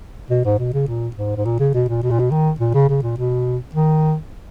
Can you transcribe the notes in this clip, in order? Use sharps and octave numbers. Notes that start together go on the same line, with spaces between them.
B2
G#2
B2
C#3
A#2
G#2
G#2
A#2
C#3
B2
A#2
B2
A#2
B2
D#3
A#2
C#3
C#3
A#2
B2
D#3